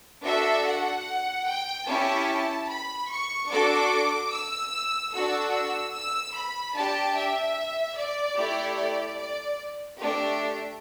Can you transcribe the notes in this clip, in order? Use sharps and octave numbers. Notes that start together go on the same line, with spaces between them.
D4 F#4 A4 E5
F#5
G5
C#4 E4 G4 A5
B5
C#6
D4 F#4 A4 D6
E6
D4 F#4 A4 E6
E6
E6
B5
D4 G4 A5
E5
D5
A3 E4 G4
D5
D5
A3 D4 G4